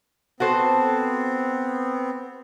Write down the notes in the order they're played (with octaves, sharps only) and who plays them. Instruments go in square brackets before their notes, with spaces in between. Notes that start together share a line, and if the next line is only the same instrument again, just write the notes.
[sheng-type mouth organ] B3 C4 [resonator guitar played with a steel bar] F#4 A4 C5